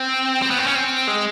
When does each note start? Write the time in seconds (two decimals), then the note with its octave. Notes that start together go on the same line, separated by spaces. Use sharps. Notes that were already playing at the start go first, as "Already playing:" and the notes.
Already playing: C4
0.42 C4
0.50 B3
0.58 C4
0.66 C#4
0.75 C4
1.07 G#3